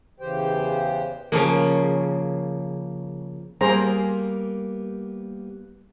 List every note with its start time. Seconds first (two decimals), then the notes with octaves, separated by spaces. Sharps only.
0.20 E2 C#3 E3 G4 C5 G5
1.32 C#3 F3 A#3
3.61 G3 A#3 B3 G#4 C5 A#5